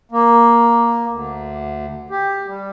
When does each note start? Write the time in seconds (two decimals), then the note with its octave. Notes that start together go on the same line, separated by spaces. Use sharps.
0.12 A#3
1.08 D2
2.10 G4
2.47 G3